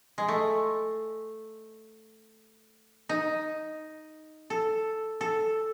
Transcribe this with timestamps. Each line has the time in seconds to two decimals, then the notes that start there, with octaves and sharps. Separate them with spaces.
0.18 G#3
0.28 A3
3.09 D#4
4.50 A4
5.21 A4